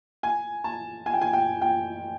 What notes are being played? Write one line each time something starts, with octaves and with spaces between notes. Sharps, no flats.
G#5
A5
G#5
G5
G#5
G5
G5